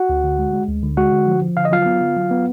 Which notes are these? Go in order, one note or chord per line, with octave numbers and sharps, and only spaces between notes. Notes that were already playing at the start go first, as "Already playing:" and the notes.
Already playing: F#4 F#5
D2
D3
G#3
G#3
D2
D3
G#3 F#4 F#5
D3
F3
F3
D3 F5
D#5
F#3 F4 F5
B3
D3
F#3
B3